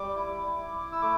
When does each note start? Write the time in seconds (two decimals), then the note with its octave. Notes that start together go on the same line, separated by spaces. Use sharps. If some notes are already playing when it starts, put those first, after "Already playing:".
Already playing: G3 D6
0.15 E4
0.59 E4
0.92 E6
1.02 A3 D6